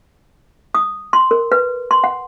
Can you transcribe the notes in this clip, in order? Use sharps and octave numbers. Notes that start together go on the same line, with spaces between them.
D#6
C6
A#4
B4
C6
F#5